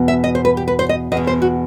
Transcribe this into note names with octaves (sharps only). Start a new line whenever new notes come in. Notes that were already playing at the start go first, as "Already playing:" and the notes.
Already playing: E2 B2
E5
D#5
C5
B4
G4
B4
C5
D#5
E2 D#5
B2
C5
F#4